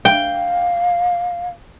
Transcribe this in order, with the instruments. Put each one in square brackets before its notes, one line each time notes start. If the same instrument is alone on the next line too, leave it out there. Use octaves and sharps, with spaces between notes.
[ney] F5 [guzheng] G5